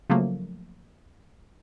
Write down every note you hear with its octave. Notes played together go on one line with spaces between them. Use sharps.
C#3 F3 F#3 A3 A#3